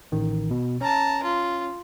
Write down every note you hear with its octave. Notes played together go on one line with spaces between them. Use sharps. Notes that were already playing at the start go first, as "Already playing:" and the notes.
A1 D#3
B2
C#4 A5 A#5
F4